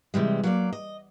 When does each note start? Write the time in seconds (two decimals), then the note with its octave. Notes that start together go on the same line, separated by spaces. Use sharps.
0.14 C3 E3 G3 G#3
0.44 F#3 A#3 D5
0.73 D#5